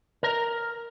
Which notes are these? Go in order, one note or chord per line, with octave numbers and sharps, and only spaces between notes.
A#4 A#5